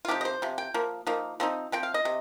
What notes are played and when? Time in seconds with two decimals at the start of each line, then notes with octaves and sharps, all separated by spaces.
0.05 F4
0.08 C3 F3 D#4 G4
0.21 D#5
0.25 C5
0.42 C3 F3
0.58 G5
0.74 F3 A#3
1.07 F3 A#3 D#4
1.40 F3 C4 D#4
1.72 F3 C4 G5
1.83 F5
1.94 D#5
2.05 C3